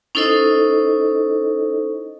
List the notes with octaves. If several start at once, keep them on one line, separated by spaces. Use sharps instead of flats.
C#4 D#4 E4 A4 C5 D#5